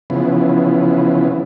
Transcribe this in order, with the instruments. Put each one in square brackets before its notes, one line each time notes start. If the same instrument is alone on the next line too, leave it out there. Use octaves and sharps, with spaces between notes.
[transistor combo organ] C#3 E3 F3 B3